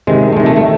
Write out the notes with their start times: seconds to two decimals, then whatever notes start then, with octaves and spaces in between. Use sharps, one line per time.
0.07 C3 D#3 G#3
0.32 A3
0.37 C3 D#3 G#3
0.46 A3
0.56 A3